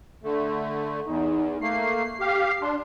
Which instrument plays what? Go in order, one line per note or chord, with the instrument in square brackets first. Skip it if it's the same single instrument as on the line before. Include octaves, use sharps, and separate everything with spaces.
[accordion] D3 A3
[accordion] E2 [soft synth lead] D#4
[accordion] A3 A#3 [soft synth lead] C7
[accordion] G4 F5
[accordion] D4 [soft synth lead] C6